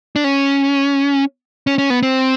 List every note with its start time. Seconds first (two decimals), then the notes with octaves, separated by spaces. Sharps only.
0.16 D4
0.24 C#4
1.67 C#4
1.78 C#4
1.90 B3
2.03 C4